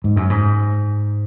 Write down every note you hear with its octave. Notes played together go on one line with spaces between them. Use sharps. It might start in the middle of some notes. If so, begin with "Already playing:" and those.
G#2
F#2
G#2